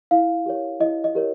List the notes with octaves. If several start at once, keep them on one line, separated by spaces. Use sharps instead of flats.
E4 F5
G4 A#4 C#5
E4 D#5
D#5
G4 A#4 C#5